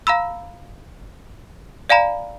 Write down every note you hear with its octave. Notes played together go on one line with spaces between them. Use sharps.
F5 A#5 B5 E6
D5 F5 G#5 A#5 B5